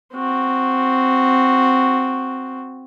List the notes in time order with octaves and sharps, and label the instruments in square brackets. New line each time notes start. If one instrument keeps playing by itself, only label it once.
[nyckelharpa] C4 F#4